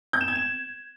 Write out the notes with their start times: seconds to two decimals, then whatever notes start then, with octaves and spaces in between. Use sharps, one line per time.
0.13 G6
0.21 E7
0.28 G#6
0.35 E7